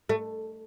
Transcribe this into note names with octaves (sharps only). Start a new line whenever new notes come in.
A3